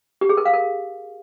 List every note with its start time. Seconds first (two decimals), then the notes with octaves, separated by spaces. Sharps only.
0.21 G4
0.29 G#4
0.37 A#4
0.45 F5
0.53 A#4